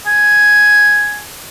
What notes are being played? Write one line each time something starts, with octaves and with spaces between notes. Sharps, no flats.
G#5